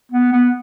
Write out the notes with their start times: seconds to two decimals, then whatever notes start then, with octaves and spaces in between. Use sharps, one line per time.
0.12 B3
0.32 B3